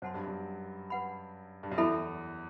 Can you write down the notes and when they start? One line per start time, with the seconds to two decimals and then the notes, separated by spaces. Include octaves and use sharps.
0.02 F#2 C5 F#5 A5 C6
0.14 G2
0.27 F#2
0.90 B4 F#5 B5
1.63 G2
1.71 F#2
1.78 E2 E4 A4 E5 B5